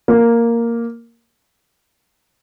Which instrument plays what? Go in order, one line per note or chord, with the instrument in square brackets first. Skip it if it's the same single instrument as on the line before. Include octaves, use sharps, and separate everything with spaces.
[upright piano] A#3